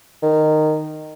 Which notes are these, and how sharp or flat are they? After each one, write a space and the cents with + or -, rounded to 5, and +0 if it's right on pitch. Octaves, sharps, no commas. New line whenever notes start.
D#3 -10